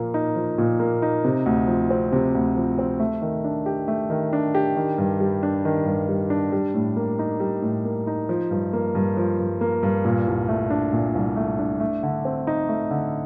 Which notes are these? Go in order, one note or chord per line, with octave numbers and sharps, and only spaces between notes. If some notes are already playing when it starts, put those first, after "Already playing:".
Already playing: A#2 F3 A#3
D#4
F3
A#2
A#3
D#4
C3
D2
F3
C4
C3
D2
F3
C4
A3
D#3
D4
G4
A3
D#3
D4
G4
D#3
G2
G3
D4
D#3
G2
G3
D4
G3
A2
A#3
D#4
G3
A2
A#3
D#4
F3
G2
A#3
G2
F3
G2
A#3
G2
A#2
C2
A3
D4
A#2
C2
A3
D4
A3
D3
C4
D#4
A3
D3